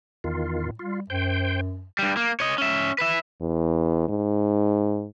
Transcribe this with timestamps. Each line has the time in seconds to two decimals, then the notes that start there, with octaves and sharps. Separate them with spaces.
0.24 E2 D#3 F4
0.62 A2
0.79 G3 F4
1.10 F#2 C5 G5
1.99 G2 G3
2.17 A#3
2.40 C#5 D#5
2.58 C#4 E5
2.98 B4 E5
3.41 E2
4.09 G#2